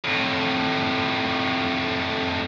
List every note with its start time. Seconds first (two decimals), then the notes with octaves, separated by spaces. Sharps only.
0.05 F2 A2